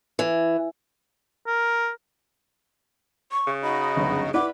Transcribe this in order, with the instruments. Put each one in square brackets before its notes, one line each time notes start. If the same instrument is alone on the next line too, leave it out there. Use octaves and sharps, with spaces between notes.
[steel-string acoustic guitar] E3
[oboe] A#4
[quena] C#6
[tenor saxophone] C#3
[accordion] D#4 F#4 D#5 [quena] B5
[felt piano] G1 C#2 F#2
[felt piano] E4 D5 F#5 [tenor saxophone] B4 [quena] D6